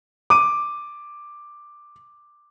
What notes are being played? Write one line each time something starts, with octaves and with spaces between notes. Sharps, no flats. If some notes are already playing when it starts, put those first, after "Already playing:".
D6 D#7